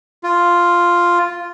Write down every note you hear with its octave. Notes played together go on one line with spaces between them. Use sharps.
F4